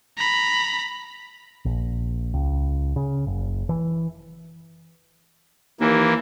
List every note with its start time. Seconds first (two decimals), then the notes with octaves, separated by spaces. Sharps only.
0.18 A#5 B5
1.65 A#1
2.34 C#2
2.96 C#3
3.27 F#1
3.69 E3
5.80 D#2 E3 A#3